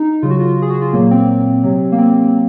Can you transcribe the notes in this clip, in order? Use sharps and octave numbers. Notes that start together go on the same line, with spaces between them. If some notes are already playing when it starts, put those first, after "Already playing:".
Already playing: D#4
C#3 F#3 F4
F#4
F4
G#4
F#4
F4
A#2 F#3 A#3
C4
C3 F#3
A#3
C4